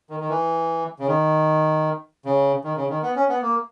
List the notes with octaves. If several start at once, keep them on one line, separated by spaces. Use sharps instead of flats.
D#3
D#3
E3
C#3
D#3
C#3
D#3
C#3
D#3
B3
C#4
B3
A#3